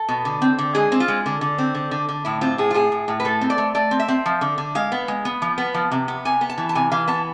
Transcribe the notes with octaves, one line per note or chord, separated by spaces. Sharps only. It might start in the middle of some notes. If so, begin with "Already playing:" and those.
Already playing: A4
B2
D3
C4
D3
G#3 G#4
C4
F4
G#3
D3
D3
C4
D3
D3
D3
A2 E4
C4 F4
A2 G#4
F4
A2 G#4
A2
A2
B4
A3 A4
C4
D5
A3
A3 D5
C4
E5
C4
F3
D3
D3
G#3 F5
B3
G#3
B3
F3
B3
F3
C3
B3
C3 G#5
B3
A5
E3
A5
C3 G#5
E3 F5
B3 A5